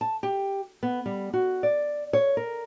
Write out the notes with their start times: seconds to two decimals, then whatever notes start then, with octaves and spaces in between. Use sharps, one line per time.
0.01 A5
0.23 G4
0.83 B3
1.06 G3
1.33 F#4
1.63 D5
2.13 C#5
2.37 A#4